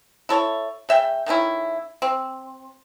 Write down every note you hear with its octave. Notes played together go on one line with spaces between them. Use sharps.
E4 A4 C#5
C#3 E5 G5
D#3 A3 C#4 E4
C4